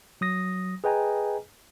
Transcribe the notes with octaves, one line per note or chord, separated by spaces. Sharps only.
F#3 D#6 A#6
G#4 B4 D#5 G5 G#5 A#5